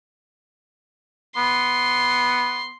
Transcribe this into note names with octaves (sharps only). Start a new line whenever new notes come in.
B3 C6